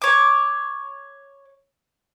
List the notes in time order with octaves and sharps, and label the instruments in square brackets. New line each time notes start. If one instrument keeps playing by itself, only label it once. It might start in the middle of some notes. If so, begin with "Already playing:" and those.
[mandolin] C#5 D6